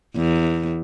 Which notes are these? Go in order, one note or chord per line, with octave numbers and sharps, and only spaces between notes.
E2